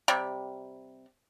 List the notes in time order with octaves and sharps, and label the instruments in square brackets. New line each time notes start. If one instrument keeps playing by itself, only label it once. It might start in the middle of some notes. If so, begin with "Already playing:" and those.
[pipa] C3 G3